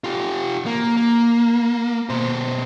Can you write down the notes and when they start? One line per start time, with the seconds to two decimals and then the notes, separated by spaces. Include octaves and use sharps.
0.04 F4 G4
0.66 A#3
0.97 A#3
2.09 B2 C5